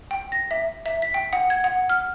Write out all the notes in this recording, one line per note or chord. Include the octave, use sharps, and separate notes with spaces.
G5
A#6
E5
E5
B6
G5
F#5
G#6
F#5
F6